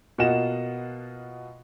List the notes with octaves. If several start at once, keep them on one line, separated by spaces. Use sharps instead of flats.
B2 A#3 F4 D#5 F#5 E7